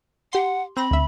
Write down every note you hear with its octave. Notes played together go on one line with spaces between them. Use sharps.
G4 F#5 C6
C4 B5 A#6
D2 E5